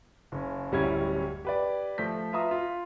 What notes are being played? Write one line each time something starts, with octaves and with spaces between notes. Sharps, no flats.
F#1 C#4
D1 F#2 G3 C#4 E4 G#6
G4 B4 D5
F3 A3 G6 B6
F4 B4 E5 A#5 D#6
F4